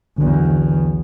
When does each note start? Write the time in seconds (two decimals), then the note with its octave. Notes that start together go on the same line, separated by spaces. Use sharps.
0.18 B1 E2 D3